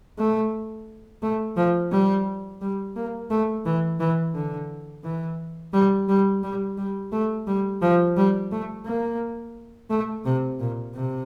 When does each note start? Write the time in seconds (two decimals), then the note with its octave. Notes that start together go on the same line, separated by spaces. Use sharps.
0.18 A3
1.22 A3
1.56 F3
1.92 G3
2.61 G3
2.96 A#3
3.30 A3
3.65 E3
4.00 E3
4.35 D3
5.04 E3
5.73 G3
6.09 G3
6.43 G3
6.77 G3
7.12 A3
7.47 G3
7.82 F3
8.17 G3
8.52 A3
8.86 A#3
9.90 A3
10.25 C3
10.60 A#2
10.94 C3